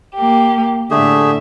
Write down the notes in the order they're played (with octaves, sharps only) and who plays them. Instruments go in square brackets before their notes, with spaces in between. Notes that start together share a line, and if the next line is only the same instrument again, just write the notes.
[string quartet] A#3 G4
[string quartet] A2 E5 [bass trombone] D3 [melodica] A3 G4 G#4